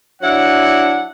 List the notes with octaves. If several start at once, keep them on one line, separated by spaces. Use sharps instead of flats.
F#3 D4 E4 F#5